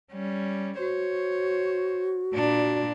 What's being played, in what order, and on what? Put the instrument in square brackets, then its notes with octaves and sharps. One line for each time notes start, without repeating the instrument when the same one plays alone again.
[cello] G3 C#4
[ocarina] F#4 [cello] C5 C#5
[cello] A#2 D4